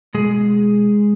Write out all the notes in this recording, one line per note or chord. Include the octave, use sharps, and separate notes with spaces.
B2 G#3 G#4